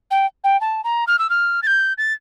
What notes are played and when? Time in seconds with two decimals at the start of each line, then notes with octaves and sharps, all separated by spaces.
0.11 G5
0.44 G5
0.61 A5
0.84 A#5
1.07 F6
1.19 E6
1.30 F6
1.63 A6
1.67 G6
1.98 A6